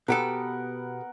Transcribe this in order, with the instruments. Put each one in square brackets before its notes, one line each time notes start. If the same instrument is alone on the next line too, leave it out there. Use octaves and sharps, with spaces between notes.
[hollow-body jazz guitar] B2 G4 A4 [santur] B3 A#4 F#5